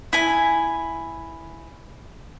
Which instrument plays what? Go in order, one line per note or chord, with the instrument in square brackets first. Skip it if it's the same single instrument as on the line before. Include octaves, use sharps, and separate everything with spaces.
[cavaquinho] E4 G#5